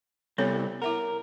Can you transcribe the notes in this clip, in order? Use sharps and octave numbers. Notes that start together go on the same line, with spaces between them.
C3 G3 B3 A4 C#5
E4 A#4 E5 F#5